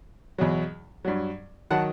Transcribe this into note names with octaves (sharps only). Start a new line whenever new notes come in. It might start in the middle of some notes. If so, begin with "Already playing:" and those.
E2 B2 F#3
G2 F#3
D#3 F#3 F#5 A5